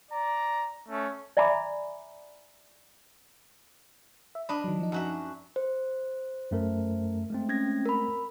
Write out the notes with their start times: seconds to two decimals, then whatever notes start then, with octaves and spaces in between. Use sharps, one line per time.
0.11 D5 A#5
0.89 A3 C#4
1.37 D5 E5 G#5 A#5 B5 D6
4.35 E5
4.49 D4 D#5 B5
4.64 D#3 F#3
4.79 F3 D#4
4.92 F#2 F#4 E5
5.56 C5
6.51 F#2 A3 A#4
7.30 G#3 A3 C4
7.49 C#4 G#6 A#6
7.86 A#4 B5